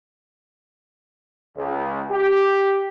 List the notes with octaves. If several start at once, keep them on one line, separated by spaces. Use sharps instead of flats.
C#2
G4